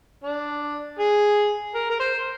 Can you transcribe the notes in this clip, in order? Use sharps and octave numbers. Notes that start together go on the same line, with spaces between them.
D4
G#4
A#4
A#4
C5